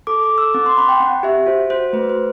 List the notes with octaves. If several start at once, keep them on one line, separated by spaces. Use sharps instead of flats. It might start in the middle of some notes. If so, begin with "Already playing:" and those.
A4 D6
D6
A4
E6
C4 D6
C6
C4 B5
G5
C4 F#5
G4 E5
F#4 C5
F#4 C5
A3 B4
C5